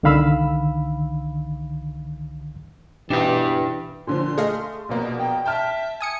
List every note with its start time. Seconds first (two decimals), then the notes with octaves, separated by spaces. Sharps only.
0.03 C2 D3 D#3 F5 B5 E6
3.10 B2 E3 D4 G4 B4
4.07 A#2 D3 F3 C6
4.38 A3 G#4 D#5 F5
4.89 A#1 B2 A#3
5.18 G5
5.46 E5 G5 A5 F6
6.01 G#5 D#6 C#7